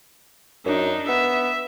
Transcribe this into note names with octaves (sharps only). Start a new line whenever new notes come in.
F#2 D4 D#4
B3 E5